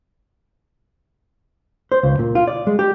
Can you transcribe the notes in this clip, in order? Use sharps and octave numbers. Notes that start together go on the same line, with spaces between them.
C5
C#2
A#2
F4
D5
G#3
G4